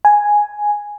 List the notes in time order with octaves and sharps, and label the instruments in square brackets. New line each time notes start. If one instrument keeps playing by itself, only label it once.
[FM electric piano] G#5